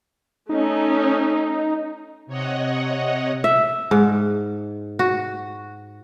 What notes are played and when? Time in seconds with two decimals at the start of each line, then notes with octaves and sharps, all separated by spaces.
0.49 A3 C#4 D#4
2.27 C3 C#5 D#5 F#5
3.44 E5
3.91 G#2
4.99 F#4